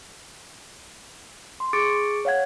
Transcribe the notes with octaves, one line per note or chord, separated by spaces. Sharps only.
C6
G#4 C#6 D6 A6 C#7 D7
C#5 F5 F#5 G#6